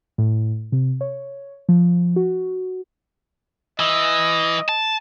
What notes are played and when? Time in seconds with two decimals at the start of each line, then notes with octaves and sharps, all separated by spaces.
0.18 A2
0.72 C3
1.01 C#5
1.69 F3
2.16 F#4
3.80 E3 D#5
4.69 A5